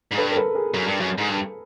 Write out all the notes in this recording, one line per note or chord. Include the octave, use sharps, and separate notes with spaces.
G#2
G2 A4 B4
A#4
A4 B4
G#4 A#4
F#2
G2
F#2
G#2
G2